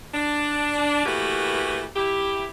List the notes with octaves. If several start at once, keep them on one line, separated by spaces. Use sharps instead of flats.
D4
E3 A3 A#3 F#4 G4 B4
E4 G4